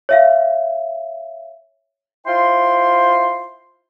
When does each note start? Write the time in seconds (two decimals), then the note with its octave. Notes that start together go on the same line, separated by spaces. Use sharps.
0.09 C#5 E5 F5
2.27 E4 F4 C5 G5 C6